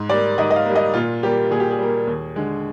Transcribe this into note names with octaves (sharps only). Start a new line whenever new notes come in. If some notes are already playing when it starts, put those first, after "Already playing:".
Already playing: G#2
G3 A#3 D5
G#2 D#5
D#5
F5
G3 A#3
D#5
A#2 F4
G3 A#3 G4
A#2 G#4
G4
G#4
G3 A#3
D#2
D3 G#3